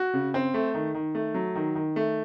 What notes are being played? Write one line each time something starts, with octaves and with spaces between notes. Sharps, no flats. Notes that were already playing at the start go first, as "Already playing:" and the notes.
Already playing: F#4
C#3
C4
A3
D#3
D#3
A3
F#3
D#3
D#3
A3